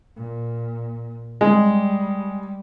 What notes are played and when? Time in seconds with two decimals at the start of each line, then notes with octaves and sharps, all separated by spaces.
0.16 A#2
1.41 G3 G#3